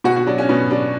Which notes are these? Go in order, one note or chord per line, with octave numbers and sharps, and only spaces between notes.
B2 F#4
F#4
F#3 D4
C#4
B2 B3
F#3 D4